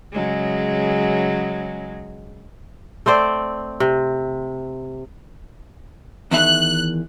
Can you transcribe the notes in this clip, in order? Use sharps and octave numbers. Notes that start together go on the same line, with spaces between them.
C#3 F#3 G#3
A3 C4 C5 D5
C3
E2 D#3 E5 F#6